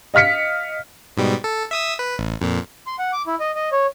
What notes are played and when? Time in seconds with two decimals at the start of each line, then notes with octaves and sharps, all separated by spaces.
0.14 D#5 F5 F6 B6 C#7
1.17 G#2 B2 G3
1.44 A4
1.71 E5 D#6 E6
1.99 B4
2.19 A1
2.41 F2 A#2
2.87 C6
2.99 F#5
3.13 D6
3.27 E4
3.40 D#5
3.55 D#5
3.72 C#5